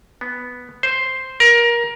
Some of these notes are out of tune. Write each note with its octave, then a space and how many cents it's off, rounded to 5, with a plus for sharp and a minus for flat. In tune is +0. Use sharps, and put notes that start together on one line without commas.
B3 +0
C5 +0
A#4 +20